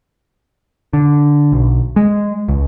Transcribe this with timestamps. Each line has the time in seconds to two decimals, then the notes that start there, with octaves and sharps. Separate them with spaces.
0.93 D3
1.52 B1
1.96 G#3
2.49 C#2